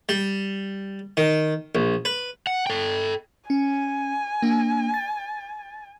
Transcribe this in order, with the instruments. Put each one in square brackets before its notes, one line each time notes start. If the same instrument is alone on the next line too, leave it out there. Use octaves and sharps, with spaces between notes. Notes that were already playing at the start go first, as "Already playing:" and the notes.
[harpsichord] G3
D#3
A#1
B4
[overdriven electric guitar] F#5
A4 G5
[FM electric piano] C#4 [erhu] G#5
[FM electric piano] A#3 D4
A6